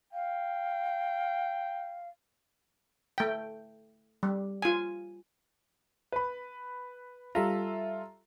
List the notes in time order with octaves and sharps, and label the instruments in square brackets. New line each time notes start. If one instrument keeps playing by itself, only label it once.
[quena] F5 [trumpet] G5
[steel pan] A3 G5
G3
F4 G#5
[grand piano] B4 B5
[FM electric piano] G3 E5 A#5 [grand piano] F4 A4